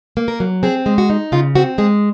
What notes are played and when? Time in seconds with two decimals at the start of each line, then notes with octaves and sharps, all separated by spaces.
0.17 A#3
0.28 A#4
0.40 F#3
0.63 C4 G#4
0.86 G#3
0.98 F#4
1.10 D#4
1.32 C#3 F4
1.55 C4 F#4
1.78 G#3 G#4